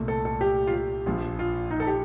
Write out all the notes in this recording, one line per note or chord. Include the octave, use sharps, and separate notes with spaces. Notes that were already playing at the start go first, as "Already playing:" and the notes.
Already playing: C2 A#2 A3
A4
A4
G4
F4
G4
A#1 A#2 F3 F4
F4
D#4
A4
G4